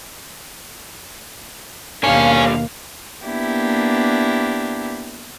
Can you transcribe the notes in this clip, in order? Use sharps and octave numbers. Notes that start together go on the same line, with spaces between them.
D#2 B2 D3 G3 A#3 C#4 F5
A#3 B3 D4 E4 G4